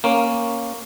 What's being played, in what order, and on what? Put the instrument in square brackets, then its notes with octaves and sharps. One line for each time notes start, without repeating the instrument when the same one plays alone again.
[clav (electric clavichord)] A#3 C#4